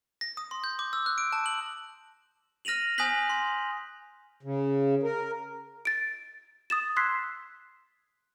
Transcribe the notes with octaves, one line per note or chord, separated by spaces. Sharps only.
A#6
D#6
C6
G6
D6
E6
F#6
D7
A5
F#7
F6 A#6 D#7 F7 F#7
G#5 D#6 F#6 G6 B6 F#7
C6
C#3
A#4
A6 D7
D#6 A6 E7
C6 E6 F#6 G#6 B6 C7